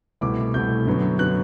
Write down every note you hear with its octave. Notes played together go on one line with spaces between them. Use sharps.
C2 B2 A3 E4 D6
C2 B2 A3 E4 G6
F#2 D3 F#3 B3
D3 F#3 B3 F#6